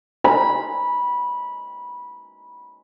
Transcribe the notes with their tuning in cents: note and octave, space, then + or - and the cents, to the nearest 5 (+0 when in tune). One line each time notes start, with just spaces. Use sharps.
B5 -15